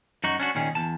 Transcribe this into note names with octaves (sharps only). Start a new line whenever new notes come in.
F#2 D#4 F#4
C#4 D4 F#4
A#2 D#3 C#4 G#4
E2 A5